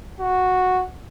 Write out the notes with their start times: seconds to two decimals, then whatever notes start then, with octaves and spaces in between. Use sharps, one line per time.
0.20 F#4